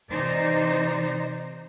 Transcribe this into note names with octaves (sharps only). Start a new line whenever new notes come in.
C3 E3 D#4 C5 D5